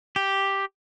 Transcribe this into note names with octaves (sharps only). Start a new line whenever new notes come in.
G4